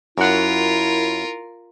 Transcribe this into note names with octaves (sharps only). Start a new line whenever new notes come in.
F#2 E4 F4 A#4 F#5